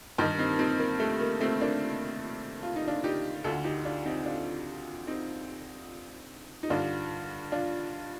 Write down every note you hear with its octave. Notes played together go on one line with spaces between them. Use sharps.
G2 D#3 D#4 G4
C4 D#4
C4 D#4
A#3
A3
A#3
A3 C4
A#3 D4
F4
D#4
D4 F4
D#4 G4
D2 D3 F4 A4
D#4 G4
D4 F4
C4 D#4
D4 F4
C4 D#4
D#4
G2 D3 D4 F4
D4 F4